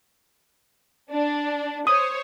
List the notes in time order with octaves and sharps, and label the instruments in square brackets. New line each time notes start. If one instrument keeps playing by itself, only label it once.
[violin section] D4
[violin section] C5 C#5 [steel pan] D#6